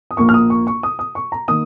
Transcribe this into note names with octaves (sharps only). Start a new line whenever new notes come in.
D#6
A#1 A#2 A#3 C#6
F6
D#6
C#6
C#6
D#6
D#6
C#6
A#5
D#3 A#3 D#6